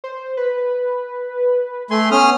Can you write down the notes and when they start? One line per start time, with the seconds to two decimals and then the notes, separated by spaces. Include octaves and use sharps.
0.04 C5
0.37 B4
1.91 A3 G#5 C6
2.11 B3 C#4 D#6 F6